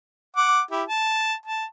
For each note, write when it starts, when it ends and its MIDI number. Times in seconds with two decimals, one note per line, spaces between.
0.36 0.60 78
0.36 0.60 86
0.71 0.83 64
0.71 0.83 67
0.89 1.34 81
1.46 1.65 81